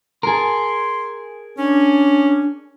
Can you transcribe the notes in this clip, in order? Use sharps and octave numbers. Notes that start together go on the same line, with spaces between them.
G#4 A#4 C6
C#4 D4